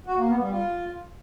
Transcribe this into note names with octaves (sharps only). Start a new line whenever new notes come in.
F#4
A#3
B3
G3
F4